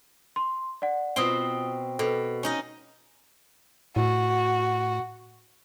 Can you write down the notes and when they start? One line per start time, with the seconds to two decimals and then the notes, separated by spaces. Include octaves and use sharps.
0.36 C6
0.82 D5 F#5
1.16 B2 C4 F4 D#6 G7
1.99 B2 A4 B4
2.43 C#4 D#4 D#5
3.96 A2 F#4